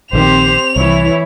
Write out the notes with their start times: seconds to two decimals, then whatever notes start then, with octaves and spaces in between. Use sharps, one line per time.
0.13 A#1 D3 D#3 C4 G4 C5 F7
0.76 C2 E3 E4 C#5